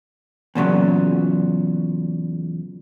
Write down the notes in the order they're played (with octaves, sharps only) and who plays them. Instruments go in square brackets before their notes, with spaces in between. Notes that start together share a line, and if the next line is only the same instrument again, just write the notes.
[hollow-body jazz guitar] E2 A#2 C#3 F#3